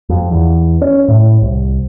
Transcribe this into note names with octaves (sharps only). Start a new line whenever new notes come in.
F2
E2
C#4
A2
C2